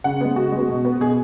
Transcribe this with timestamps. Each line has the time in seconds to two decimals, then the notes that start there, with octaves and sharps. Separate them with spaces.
0.04 C#3 F#5
0.21 G#3 B3
0.36 C#3 F#4
0.52 G#3 B3
0.69 B2
0.85 B3
1.01 B2 G#4